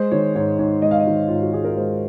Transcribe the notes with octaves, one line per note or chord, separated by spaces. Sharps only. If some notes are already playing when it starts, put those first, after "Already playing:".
Already playing: G#3 C5
D#3 C#5
G#2 C#5
G#2 C#5
G#3 D#5
F5
D#5
D#3
G#2 F4
F#4
G#2 G#4
A#4
G#3 C5